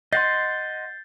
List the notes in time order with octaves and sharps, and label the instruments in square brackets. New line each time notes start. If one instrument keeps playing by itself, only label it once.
[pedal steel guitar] D#5 F#5 C6 [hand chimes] G6 A6 C7